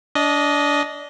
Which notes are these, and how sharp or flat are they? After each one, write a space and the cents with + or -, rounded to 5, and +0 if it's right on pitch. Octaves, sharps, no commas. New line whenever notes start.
D4 -25 D#5 +0